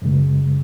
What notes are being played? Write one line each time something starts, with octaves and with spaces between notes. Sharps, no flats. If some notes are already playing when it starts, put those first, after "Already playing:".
F#2 C#3 G#3